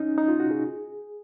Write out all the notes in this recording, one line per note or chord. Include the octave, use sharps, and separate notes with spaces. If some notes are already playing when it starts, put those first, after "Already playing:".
Already playing: C#4 D#4
D#4
F4
F#4
G#4